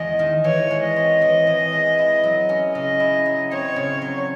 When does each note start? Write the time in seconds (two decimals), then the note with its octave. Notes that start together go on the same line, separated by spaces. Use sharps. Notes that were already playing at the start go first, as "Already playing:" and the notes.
Already playing: E2 G#3 D#5
0.19 D#3
0.44 E3 C#5
0.71 G#3
0.83 D#5
0.96 C4
1.22 E3
1.47 E3
1.73 G#3
1.99 E4
2.23 F#3
2.49 C#4
2.74 C#3 D#5
3.00 E4
3.25 F#3
3.51 C4 C#5
3.76 C#3
4.02 F#3